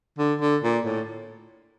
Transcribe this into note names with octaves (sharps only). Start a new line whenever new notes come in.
D3
D3
A#2
A2